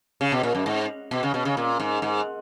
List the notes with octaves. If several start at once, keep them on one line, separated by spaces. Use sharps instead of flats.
C#3
B2
A#2
F#2
G#2
B2
C#3
B2
C#3
A#2
G#2
G#2